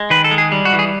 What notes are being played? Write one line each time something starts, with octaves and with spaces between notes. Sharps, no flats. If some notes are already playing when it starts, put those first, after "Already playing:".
Already playing: G#3
D#3 B4
A4
G#3
G#4
G3
F#4
E3
G#4